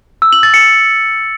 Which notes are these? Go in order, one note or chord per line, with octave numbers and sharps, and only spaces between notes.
E6
F#7
A6
C#7